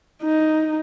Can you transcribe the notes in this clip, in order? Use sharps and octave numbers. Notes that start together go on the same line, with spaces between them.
D#4